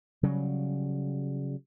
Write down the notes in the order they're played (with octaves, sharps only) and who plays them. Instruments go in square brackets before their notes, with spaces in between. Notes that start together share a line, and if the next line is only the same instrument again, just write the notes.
[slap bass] C#3 F#3 G3